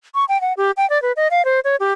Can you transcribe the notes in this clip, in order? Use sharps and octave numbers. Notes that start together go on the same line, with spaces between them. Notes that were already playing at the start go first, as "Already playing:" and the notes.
C#6
G5
F#5
G4
G5
D5
B4
D#5
F5
C5
C#5
G4